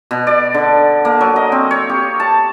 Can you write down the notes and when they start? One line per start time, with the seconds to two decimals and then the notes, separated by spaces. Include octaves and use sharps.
0.11 B2
0.27 D5
0.54 D3
1.05 A#3
1.21 F#3
1.36 D#5
1.52 C4
1.71 C#5
1.90 G4
2.20 A5